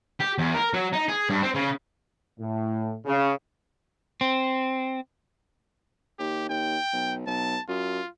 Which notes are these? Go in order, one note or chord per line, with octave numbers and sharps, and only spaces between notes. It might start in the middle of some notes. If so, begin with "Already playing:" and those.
G4
E2
A#4
F#3
D#4
G#4
G2
C4
C#3
A2
C#3
C4
D#2 G4
D#2 G5
B1
B1 A5
F#2 F4